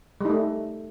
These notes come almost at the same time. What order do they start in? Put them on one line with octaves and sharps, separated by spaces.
G3 D#4 A3